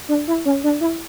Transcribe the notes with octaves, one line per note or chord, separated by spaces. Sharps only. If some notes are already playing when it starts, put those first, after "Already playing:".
D4
E4
C#4
D4
E4